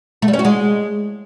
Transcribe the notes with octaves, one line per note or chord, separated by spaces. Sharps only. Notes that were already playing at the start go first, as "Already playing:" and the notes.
A3
G3
C#4
F#4
G#3